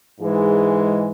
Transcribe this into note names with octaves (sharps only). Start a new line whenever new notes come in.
G#2 E3 G#3